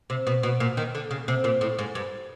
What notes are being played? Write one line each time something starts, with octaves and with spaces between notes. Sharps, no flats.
C3
B2
B2
A#2
D#3
D3
C#3
C3
A#2
A2
G#2
G2